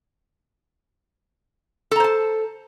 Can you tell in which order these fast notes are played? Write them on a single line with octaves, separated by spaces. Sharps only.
A4 A#5 C5 A5